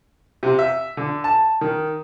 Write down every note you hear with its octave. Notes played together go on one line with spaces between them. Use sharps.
C3
E5
D3
A5
D#3